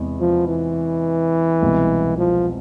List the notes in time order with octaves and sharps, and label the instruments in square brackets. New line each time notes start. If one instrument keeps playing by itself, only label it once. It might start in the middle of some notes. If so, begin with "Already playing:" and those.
Already playing: [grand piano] E2 C3 G#3 B3 E4
[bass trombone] F3
E3
[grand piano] C2 B2 G#3 B3
[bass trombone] F3